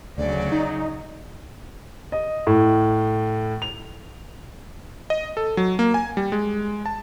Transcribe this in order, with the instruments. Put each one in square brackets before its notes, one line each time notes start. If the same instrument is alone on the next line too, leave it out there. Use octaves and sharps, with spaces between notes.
[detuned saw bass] D2 [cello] C#3 F#3 [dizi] D5
[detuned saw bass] D#4
[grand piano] D#5
A2
F7
[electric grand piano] D#5
A4
F#3
A#3
G#5
G3
G#3
A5